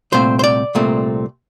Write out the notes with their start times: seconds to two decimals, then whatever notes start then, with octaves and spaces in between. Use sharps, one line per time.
0.12 C2 A#2 A3 C4 C5
0.39 C5
0.44 D5
0.75 C2 A#2 A3 C4